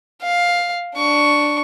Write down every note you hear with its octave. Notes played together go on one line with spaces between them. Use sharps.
F5
D4 C#6